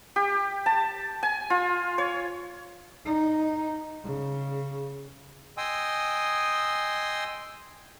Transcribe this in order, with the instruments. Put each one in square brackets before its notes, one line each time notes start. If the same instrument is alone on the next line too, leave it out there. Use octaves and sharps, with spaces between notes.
[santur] G4
A5
G#5
F4
C#5
[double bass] D#4
C#3
[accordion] D#5 G5 G#5 C6 D#6 E6